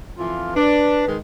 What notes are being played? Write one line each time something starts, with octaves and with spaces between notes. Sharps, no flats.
F2 E3 F4
D4 B4
D#3 G#3